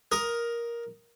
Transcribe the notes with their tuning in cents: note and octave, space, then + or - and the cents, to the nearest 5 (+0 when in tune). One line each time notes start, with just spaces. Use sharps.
A#4 +10 D#6 +0